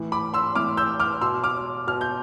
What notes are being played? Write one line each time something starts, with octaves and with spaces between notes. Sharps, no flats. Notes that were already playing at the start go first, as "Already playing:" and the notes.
Already playing: A2 E3
B5 D6
C6 E6
A2 E3 D6 F6
E6 G6
D6 F6
B2 C6 E6
D6 F6
B2 F6
G6